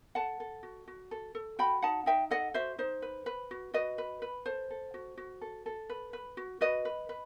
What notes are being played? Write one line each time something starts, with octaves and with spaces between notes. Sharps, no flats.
A4 F#5 A5
A4
F#4
F#4
A4
A4
F#4 G5 B5
D#4 F#5 A5
D#4 E5 G5
A4 D#5 F#5
F#4 C5 E5
D#4 C5
B4
B4
F#4
F#4 B4 D#5
B4
B4
A4 C5
A4
F#4
F#4
A4
A4
B4
B4
F#4
F#4 B4 D#5
B4
B4